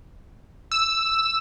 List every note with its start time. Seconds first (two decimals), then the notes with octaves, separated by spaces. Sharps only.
0.71 E6